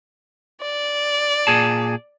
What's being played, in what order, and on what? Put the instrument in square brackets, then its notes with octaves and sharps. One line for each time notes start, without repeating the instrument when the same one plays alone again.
[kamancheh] D5
[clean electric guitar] A#2 G#4 A5